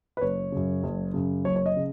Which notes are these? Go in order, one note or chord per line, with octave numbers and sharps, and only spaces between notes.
B4
F#1 C#5
F#2 C#3
F#1
F#2 C#3
F#1 C#5
C#5
D#5
C#3